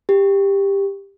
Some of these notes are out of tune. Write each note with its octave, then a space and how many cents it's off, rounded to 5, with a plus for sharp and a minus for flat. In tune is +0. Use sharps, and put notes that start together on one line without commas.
G4 +15